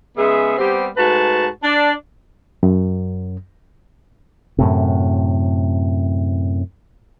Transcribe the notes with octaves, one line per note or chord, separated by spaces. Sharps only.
C#3 G#3 B3 G#4 E5
G3 B3 C4 G4
G#2 A3 F#4 B4 A5
D4
F#2
F#2 A2 C3